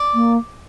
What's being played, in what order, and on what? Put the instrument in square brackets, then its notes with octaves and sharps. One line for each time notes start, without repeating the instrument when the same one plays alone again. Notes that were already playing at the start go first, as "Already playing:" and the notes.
Already playing: [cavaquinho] D5
[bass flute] A#3